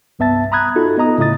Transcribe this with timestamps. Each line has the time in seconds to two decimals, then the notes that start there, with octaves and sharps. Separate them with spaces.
0.19 C2 G2 B3 E5 A5 A6
0.52 A#5 B5 D#6 F#6 G#6
0.76 D#4 F4 F#4 A4
0.98 B3 D#5 A#5 D#6
1.18 A2 C#3 E4 D#5 D#6 A6